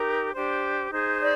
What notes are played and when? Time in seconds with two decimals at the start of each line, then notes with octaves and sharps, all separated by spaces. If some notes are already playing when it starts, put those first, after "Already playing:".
Already playing: D#4 G4 A#4
0.34 D4 G4 C5
0.91 D#4 G#4 C5
1.20 D5